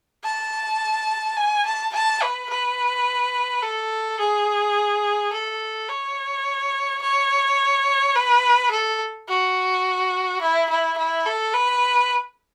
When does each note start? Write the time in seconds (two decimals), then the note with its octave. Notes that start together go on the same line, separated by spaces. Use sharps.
0.24 A5
1.37 G#5
1.65 A5
1.93 A5
2.22 B4
2.50 B4
3.62 A4
4.19 G#4
5.33 A4
5.89 C#5
7.02 C#5
8.15 B4
8.71 A4
9.28 F#4
10.41 E4
10.70 E4
10.98 E4
11.26 A4
11.54 B4